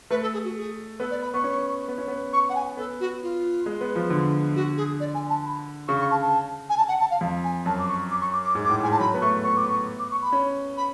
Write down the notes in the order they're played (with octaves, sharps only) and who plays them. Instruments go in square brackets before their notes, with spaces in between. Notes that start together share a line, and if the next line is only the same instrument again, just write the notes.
[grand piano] A3 [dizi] B4
[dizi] A4
G#4
F#4
G#4
[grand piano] B3 [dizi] A4
[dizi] D5
B5
[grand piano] B3 [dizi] C#6
[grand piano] C#4
B3
C#4
B3
[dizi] C#6
F#5
G#5
[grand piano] B3 [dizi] A4
[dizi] F#4
F4
[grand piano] G#3
B3
F3
D3
[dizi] F#4
G#4
D5
G#5
A5
B5
[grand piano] C#3 [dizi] C#6
[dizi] C#6
A5
A5
G#5
A5
F#5
A5
F5
[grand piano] F2
[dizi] G#5
[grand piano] F#2 [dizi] A5
[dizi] D6
C#6
D6
C#6
D6
D6
[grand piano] G#2
[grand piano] A2 [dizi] D6
[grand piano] G#2 [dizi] G#5
[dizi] A5
[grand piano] F#3 [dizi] B5
[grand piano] B3
[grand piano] A3 [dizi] C#6
[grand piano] B3 [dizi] C#6
[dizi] D6
C#6
D6
C#6
B5
[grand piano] C#4
[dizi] B5